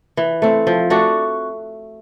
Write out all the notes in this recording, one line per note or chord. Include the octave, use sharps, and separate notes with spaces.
E3
A3 C4
F3
A3 D4 F#4